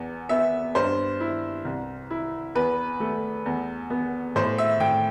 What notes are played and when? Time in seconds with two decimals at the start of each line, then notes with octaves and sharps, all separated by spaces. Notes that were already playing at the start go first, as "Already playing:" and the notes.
Already playing: E2 B3
0.29 B3 E5
0.75 G2 C5
1.20 E4
1.65 C2
2.11 E4
2.55 E2 B4
3.00 A3
3.46 E2
3.90 B3
4.36 A2 C5
4.58 E5
4.80 A2 G5